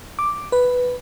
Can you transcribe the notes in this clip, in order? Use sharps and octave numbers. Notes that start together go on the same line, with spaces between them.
D6
B4